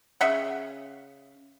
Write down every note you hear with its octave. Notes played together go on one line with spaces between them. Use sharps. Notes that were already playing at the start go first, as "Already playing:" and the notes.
C#3 E5 F#5